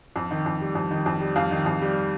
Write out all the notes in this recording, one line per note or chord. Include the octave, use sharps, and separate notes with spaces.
F2
D#3
F2
G3
F2
D#3
F2
G3
F2 F5
D#3
F2
G3